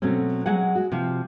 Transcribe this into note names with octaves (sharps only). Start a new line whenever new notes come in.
B2 F#3 A3 C4 C#4
F#3 G#3 G#4 F#5
F#4
C3 F3